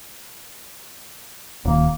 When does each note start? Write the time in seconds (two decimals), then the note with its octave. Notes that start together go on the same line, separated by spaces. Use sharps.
1.65 D#1 D#3 A#3